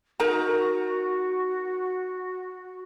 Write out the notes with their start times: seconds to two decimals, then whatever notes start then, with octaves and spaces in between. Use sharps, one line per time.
0.20 D#4 F#4 A#4 A#5